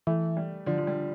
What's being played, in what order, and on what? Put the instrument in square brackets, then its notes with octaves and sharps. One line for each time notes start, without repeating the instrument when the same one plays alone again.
[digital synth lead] E3 [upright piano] A3
[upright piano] G3
[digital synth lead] D3 [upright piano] F3
[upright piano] F3
G3